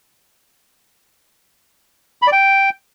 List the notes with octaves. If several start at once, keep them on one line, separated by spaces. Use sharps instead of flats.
B5
D5
G5